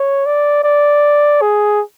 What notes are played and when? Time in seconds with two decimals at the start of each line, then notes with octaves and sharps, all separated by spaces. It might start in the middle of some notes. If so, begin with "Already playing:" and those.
Already playing: C#5
0.26 D5
0.63 D5
1.41 G#4